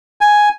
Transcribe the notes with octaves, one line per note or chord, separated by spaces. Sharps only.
G#5